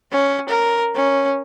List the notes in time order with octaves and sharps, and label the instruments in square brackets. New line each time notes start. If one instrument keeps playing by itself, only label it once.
[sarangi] C#4
A#4
C#4